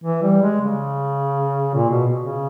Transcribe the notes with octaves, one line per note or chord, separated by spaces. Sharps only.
E3
G3
G#3
C#3
A#2
B2
C#3